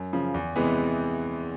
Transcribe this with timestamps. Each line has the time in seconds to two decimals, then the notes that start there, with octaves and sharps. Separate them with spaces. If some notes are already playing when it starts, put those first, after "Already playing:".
Already playing: F#2
0.13 C#3 F3
0.34 E2
0.56 C3 E3 G#3 B3